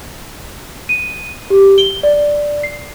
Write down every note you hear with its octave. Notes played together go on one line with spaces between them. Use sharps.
D#7
G4
G7
D5
C7